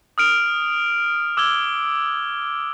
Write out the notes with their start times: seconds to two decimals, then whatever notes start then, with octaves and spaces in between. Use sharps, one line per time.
0.18 D#6 F6 D7 F7
1.37 D6 E6 F6 G#6 G7